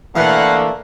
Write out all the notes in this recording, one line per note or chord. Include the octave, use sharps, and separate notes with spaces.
E2 B2 D3 E3 A3 A#3 F5 F#5